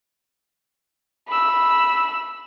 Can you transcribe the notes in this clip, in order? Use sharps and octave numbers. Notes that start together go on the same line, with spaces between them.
B5 E6